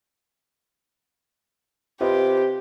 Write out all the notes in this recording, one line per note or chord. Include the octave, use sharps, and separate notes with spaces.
C3 F4 G4 B4 D#5